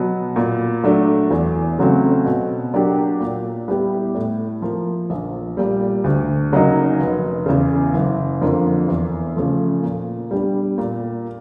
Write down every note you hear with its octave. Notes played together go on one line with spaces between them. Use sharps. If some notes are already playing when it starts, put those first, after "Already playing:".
Already playing: B2 F#3 B3
A#2
F#3 A3 D4
E2
C#3 F#3 A3 C4
B2
F#3 A#3 D4 G4
A#2
G3 B3 E4 G4
A2
F3 A#3
A#1
A#2 G3
D2
C#3 F#3 A#3 D#4
F1
E2 C#3
F#1
F2 D3 F3 A#3
E2
C#3 F3 A3
A#2
G3 B3 D4 G4
A#2